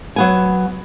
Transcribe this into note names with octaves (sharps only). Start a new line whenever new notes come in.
F#3 B3 G#5